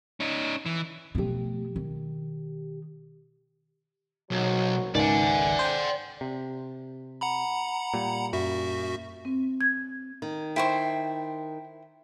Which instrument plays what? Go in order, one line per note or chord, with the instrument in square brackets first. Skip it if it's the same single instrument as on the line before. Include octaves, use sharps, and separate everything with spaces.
[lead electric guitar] C#4 D#4
E3
[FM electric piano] B2 G4 [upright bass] F3 A3
[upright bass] D#3
[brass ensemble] F#1 G#2 F#3 [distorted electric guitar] B1
[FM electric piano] G#1 C#2 D#3 [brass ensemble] B4 E5 G#5 [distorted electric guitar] D5 F#5
[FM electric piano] C5 G5
[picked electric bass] C3
[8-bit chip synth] F#5 A#5 B5
[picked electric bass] A#2 G3
[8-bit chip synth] F#2 F#4 E5
[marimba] C4
G#6
[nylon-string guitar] D#3
[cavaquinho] E4 C5 C#6 [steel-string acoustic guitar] G5